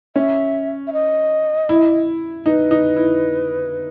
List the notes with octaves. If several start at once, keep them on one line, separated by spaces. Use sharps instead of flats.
C#4 E5
E5
D#5
E4
D#4 B4
D#4
E4